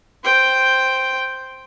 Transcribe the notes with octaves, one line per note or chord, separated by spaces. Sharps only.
C5 G5